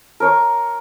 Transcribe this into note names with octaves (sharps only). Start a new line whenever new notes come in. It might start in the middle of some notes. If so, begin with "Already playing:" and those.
A#4 C#5